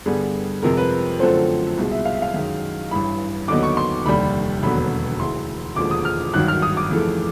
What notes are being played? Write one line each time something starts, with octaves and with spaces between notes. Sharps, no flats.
G2 D3 G3 B3 G#4
F2 C3 F3 G#3 A#4
B4
F#2 D3 F3 A3 C4 C5
C2 B2 G#3
E5
F5
E5
F5
F#2 D#3 G#3
A1 G2 E3 B5
D#2 D3 F#3 B3 D#4 D6
C#6
C6
F1 D#2 D3 G3 B5
E1 D#2 D3 F#3 B3 B5
D2 C#3 E3 C6
E1 D#2 D3 F3 G#3 D6
D#6
F6
G#1 G2 D#3 F#3 F#6
F6
D#6
D6
F2 C#3 E3 A3